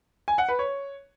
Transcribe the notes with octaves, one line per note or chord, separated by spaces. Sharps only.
G#5
F#5
B4
C#5